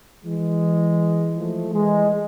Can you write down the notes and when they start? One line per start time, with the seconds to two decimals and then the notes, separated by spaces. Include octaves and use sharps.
0.25 E3 G#3
1.35 F3 A3
1.72 E3 G#3